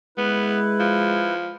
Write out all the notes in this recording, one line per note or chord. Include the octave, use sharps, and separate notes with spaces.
G#3 B3 E4 B4
F3